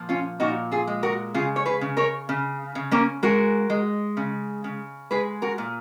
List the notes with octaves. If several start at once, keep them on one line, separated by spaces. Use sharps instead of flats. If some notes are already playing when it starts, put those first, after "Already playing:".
Already playing: A#2 F3
C#4 F4
A#2 D#4 F#4
F4 G#4
G#3
F#4 A#4
C#3 F4 G#4
C#5
G#4 B4
C#3
A#4 C#5
C#3
C#3
A#3 C#4
G#3 F#4 A#4
G#3
C#3
C#3
G#3 G#4 B4
F#4 A#4
A#2